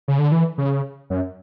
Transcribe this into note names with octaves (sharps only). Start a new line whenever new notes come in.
C#3
D3
E3
C#3
F#2